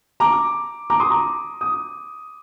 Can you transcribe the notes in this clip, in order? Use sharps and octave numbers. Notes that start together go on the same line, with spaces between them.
A#5 D6
A#5 D6
C6 D#6
A#5 D6
D#6